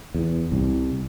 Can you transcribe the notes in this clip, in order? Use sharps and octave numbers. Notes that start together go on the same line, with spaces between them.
E2
C2